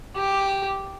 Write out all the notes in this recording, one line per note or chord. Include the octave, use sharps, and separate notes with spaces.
G4